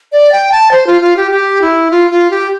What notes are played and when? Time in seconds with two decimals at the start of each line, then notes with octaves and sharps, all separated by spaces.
0.12 D5
0.32 G5
0.52 A5
0.71 C5
0.87 F4
1.01 F4
1.17 G4
1.31 G4
1.61 E4
1.91 F4
2.11 F4
2.31 G4